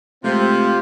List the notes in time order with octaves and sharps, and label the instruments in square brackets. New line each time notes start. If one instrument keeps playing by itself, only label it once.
[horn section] C3 [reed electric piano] G#3 A3 [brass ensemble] C4 [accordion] F4